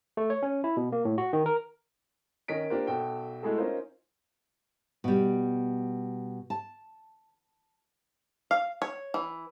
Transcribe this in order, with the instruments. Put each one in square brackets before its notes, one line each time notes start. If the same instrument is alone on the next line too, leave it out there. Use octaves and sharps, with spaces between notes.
[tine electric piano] A3
C#5
C#4
E4
B2
A#3
A2
F#4
D#3
A#4
[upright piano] D#3 C#4 D#5 B6 D7
A#3 D4 F4 G4 A#4 C5
B1 F#4 A4 G5 A5
G#3 A3 E4 F#4 G#4 A4
C#4 D#4 F4 A#4 C5
[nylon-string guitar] B2 G3
A5
[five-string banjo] F5
C#5
E3